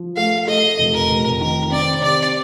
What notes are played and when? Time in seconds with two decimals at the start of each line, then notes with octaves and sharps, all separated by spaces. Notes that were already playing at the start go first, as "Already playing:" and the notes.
Already playing: F3
0.16 A3 F5
0.47 A3 D#5
0.79 F1
0.94 A#4
1.09 F1
1.41 D#3 A#4
1.72 C4 D5
2.02 C3 D5